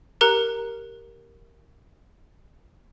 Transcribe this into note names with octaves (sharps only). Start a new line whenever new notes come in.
G4 A#4 A#5 F#6 C#7